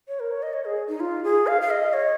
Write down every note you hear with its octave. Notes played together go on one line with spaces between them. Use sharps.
C#5
A#4
C#5
D#5
C#5
G#4
D#4
F4
G#4
F5
F5
D#5
C#5